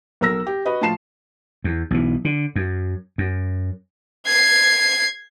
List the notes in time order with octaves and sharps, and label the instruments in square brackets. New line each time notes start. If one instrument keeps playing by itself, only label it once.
[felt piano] B1 A#4 E6 A#6
G4
F#4 B4 D#5
A2 F3 F4 A5 C7 E7
[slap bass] E2
B1 E3
D3
F#2
F#2
[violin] G#6 C7